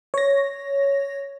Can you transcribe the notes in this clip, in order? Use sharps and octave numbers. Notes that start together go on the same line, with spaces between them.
C#5 A#6